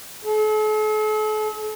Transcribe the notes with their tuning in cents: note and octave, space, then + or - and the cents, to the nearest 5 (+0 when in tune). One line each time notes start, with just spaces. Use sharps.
A4 -45